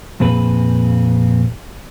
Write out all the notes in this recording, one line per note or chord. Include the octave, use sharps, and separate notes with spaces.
F2 A#2 C4 G#4 B4